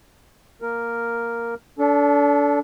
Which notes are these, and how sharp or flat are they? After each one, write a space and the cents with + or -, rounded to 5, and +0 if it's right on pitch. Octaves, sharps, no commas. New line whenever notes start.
A#3 +0 A#4 +0
D4 -30 A4 +0